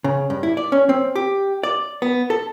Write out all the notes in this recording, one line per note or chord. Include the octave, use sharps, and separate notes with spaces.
C#3
G2
E4
D5
C#4
C4
G4
D5
B3
A4